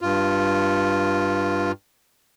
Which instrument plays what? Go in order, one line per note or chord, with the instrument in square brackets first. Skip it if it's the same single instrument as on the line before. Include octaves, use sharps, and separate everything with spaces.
[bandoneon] G2 F4